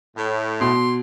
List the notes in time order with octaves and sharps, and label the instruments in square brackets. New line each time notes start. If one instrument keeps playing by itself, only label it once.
[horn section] A2
[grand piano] B2 [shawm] C6